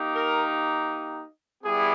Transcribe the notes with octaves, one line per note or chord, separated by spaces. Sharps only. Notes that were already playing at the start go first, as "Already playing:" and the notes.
Already playing: A#3 D#4 G4
A#4
G3 B3 E4 G4 G#4